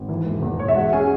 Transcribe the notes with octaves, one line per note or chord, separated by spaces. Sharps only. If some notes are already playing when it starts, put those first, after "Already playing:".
Already playing: G#1
E3
E1
E2
E1 C#5
E5
G#3 F#4 F#5
C#4 G#4 G#5